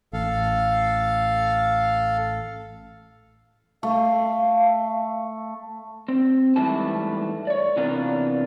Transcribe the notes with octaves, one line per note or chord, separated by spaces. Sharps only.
A1 A4 F5
A3 F5
C4
G#2 E3 G3 A3 B4 A5
C#5 D5
C3 E3 B3 D4 F4 A#4